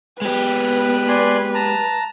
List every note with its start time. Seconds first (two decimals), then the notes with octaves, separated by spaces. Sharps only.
0.22 G#3 B3 G4 B4
1.08 D5 G#5 C6
1.54 A5 A#5